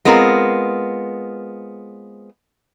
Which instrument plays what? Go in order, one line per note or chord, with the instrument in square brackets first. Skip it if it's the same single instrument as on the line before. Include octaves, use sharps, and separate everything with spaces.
[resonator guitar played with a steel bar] G#3 B3 C4 F4 A#4